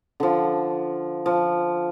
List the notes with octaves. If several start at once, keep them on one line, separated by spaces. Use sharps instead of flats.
D3 F3
F3